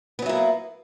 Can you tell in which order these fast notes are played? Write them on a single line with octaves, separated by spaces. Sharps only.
B3 F#3 E4 A#3